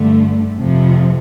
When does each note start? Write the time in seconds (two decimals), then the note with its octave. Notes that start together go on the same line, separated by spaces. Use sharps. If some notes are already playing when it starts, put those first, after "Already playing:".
Already playing: G2 D3 A3
0.57 F2 C3 F3